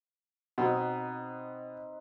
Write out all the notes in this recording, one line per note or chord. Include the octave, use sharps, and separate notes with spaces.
B2 C4 D#4 B4 F#5